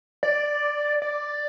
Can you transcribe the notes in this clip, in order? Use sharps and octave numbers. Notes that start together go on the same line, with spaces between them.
D5
D5